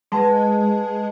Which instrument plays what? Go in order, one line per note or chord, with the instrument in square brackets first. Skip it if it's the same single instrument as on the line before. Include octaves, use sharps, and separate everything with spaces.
[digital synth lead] G#3 [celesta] B4 F#5 A5